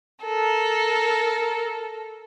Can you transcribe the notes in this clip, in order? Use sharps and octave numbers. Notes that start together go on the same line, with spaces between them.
A4 A#4